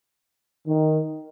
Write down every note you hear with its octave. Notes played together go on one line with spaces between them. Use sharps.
D#3